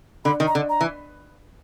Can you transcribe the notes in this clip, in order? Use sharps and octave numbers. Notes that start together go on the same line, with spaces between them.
D3 B5
D#3
A#5
D3
A#5
E3